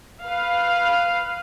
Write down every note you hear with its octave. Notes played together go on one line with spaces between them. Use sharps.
B4 F5